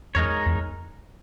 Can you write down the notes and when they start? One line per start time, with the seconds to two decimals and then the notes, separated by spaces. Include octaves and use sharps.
0.15 E2 G#3 D#4 A#4 C#5
0.46 E2